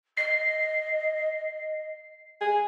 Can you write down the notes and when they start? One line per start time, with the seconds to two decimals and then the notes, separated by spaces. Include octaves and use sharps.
0.17 D#5 C7
2.41 G#4